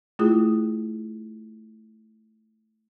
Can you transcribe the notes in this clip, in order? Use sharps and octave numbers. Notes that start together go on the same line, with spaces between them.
A3 E4 F4 G#4 D#6